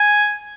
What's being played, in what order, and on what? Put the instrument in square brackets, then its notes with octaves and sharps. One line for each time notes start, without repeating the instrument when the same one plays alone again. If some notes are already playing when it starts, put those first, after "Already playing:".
Already playing: [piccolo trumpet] G#5